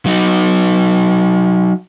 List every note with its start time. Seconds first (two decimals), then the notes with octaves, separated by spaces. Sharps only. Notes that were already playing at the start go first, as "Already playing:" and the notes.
0.06 F#3 D#4